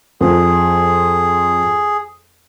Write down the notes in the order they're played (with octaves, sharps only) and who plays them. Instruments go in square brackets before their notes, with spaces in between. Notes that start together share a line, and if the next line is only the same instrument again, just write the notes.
[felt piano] F2 [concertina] G#4